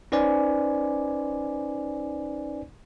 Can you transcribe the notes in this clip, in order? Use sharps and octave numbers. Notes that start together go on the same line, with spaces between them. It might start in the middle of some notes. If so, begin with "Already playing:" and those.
C#4 D#4 B4 C5 D5 G#5